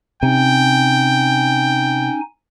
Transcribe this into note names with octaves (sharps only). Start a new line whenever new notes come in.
C3 C#4 D#4 G5 G#5